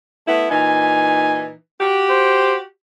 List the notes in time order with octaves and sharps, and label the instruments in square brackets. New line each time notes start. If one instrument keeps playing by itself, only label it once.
[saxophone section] A3 B3 E4
[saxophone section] A#2 E3 D#4 [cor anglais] G#5
[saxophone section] F#4 G4
[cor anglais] C5